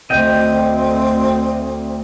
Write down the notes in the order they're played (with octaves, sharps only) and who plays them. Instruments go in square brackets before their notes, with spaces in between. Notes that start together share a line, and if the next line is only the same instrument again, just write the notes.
[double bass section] D2 [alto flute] C4 [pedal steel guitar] D#5 G5